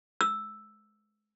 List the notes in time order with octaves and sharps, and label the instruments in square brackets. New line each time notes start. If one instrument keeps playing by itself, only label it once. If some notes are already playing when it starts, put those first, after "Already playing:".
[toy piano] E6